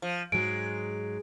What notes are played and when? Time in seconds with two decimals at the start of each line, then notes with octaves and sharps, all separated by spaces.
0.02 F3
0.32 G#2 F#3 G#3 D7